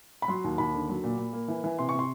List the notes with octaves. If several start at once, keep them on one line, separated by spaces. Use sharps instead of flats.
B5
F#3 C6
D#2
D#2 B5
D3
F#3
A#2
A#2
A#3
E3
E3
C3 C6
C#6
C3
C6